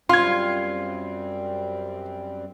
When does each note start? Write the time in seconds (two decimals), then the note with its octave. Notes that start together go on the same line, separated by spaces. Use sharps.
0.09 F#2 G3 C4 F4 C6 G#6